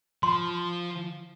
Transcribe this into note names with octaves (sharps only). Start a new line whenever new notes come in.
F3 C6